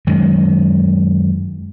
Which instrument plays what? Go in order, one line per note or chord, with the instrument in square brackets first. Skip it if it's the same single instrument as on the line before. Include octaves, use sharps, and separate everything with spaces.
[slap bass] F#2 D#3 G#3